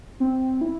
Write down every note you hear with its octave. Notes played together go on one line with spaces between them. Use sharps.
C4
E4